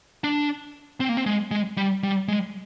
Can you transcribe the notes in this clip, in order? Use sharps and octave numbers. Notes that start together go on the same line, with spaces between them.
D4
C4
A#3
C4
G#3
G#3
G3
G3
G#3